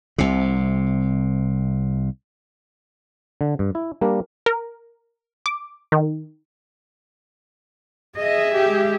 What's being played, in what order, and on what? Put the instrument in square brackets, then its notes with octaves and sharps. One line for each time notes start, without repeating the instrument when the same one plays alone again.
[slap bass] C2 C3
[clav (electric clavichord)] D3
G2
E4
G3 A#3 D4 A#4
[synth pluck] A#4
D6
D#3
[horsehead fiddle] G#4 E5 [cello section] D#5
[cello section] G#3 G4